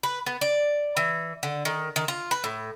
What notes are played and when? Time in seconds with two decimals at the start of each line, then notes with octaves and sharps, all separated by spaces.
0.03 B4
0.26 B3
0.41 D5
0.97 E3
1.43 D3
1.65 D#3
1.96 D#3
2.08 F4
2.31 B4
2.44 A2